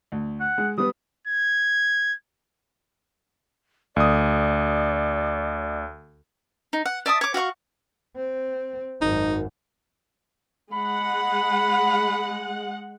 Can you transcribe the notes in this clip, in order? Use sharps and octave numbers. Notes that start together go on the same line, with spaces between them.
D2
F#5
G#3
G3 B3 B4 D#6
G#6
D2 D5 D#6
D#4
F#5
D5 E5 A5 D#6
C#5 D6
F#4 F5 F#5 C#6
C4
G#1 F#2 D#4
G#3 F#5 B5